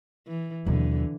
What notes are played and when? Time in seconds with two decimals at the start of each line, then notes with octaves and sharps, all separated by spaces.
0.28 E3
0.66 D#2 B2 D3 E3 F#3